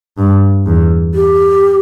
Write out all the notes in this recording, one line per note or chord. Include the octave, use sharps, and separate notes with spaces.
G2
E2
G4